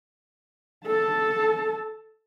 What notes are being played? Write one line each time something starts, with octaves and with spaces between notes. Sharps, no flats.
A4 A5